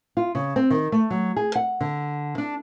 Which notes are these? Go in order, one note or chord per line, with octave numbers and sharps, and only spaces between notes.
F4
C#3
C4
D#3
A3
F#3
G#4
F#5
D3
D4